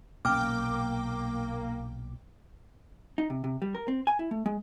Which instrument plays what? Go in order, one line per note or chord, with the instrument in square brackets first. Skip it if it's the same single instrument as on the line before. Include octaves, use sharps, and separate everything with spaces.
[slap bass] B1 A#2 C#4 [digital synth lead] A#3 [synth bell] G5 D6 [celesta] F6
[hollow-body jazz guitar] D#4
C3
C3
G3
A#4
C4
G#5
E4
A3
G#3